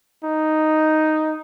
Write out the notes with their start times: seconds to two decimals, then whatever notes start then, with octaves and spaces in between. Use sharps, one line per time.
0.24 D#4